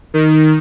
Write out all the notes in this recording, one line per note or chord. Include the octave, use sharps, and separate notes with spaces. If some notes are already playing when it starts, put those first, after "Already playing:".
D#3